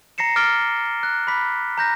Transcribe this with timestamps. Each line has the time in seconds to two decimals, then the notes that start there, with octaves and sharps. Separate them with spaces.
0.18 A#5 A#6 C7 C#7 E7
0.36 D6 F6 A6 D7 G7
1.03 F#6
1.27 B5 D6 B6
1.78 A#5 G6 A#6